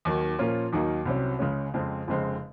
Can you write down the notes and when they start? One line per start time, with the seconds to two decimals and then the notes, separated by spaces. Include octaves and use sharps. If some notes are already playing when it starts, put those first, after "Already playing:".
0.05 D#2 D#3 F#3
0.39 A#2 F3 A#3 C#4 F4
0.72 D#2 D#3 F#3 A#3 D#4
1.06 C2 C3 F#3 C#4
1.39 C#2 C#3 G#3 C#4
1.74 F2 C#3 G#3 C4
2.07 F1 F2 C#3 G#3 C4